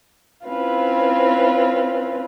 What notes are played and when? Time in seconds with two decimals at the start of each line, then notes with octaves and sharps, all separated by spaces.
0.48 C4 C#4 E4 F4 B4